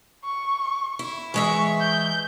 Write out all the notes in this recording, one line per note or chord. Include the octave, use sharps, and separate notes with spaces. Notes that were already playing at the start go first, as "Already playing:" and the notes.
C#6
E4
E3 G#3 E5 C#6
G6